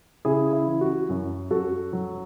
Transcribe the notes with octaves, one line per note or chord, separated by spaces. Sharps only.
C#3 E4 G#4
E4
E3
F#4
F#2
F#2 F#4 A4
F#3